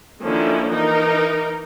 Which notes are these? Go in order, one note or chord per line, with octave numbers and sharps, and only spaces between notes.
D3 D#3 F3 A#3 C#4 E4
E3 D#4 A#4